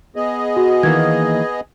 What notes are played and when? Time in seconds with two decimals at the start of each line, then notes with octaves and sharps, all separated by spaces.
0.16 B3 G#4 D#5
0.56 F#4
0.83 D#3 E3 A#3 G#6